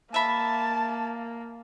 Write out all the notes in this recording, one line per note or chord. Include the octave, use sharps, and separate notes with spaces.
A#3 E5 A5 B5